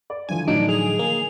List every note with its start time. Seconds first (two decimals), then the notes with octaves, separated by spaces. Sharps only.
0.10 D5
0.29 D3 E3 F3 G#5
0.48 A2 F#3 D4 D#4 D7
0.69 G#4 F7
0.99 A#3